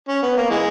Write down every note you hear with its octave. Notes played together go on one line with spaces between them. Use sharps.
C#4
B3
A#3
E3 G#3